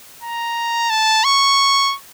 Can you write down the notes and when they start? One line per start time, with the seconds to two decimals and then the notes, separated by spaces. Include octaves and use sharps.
0.22 A#5
0.90 A5
1.24 C#6